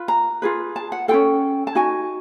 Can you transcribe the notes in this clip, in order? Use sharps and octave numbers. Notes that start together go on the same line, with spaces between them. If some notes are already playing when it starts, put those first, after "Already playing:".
Already playing: F4 B4
A#5
F4 G#4 B4
A5
F#5
F4 A4 G5
C#4
A5
D#4 F#4 G#5